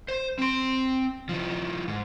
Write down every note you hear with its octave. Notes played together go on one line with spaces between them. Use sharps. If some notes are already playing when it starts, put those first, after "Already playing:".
C5
C4 C6
D#3 F3
G#2